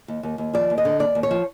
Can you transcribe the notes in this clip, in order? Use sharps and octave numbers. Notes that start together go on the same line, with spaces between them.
D#2
D#2
D#2
F3 D5
D#2
D#5
D3
D#2 D5
D#2
C#5
F3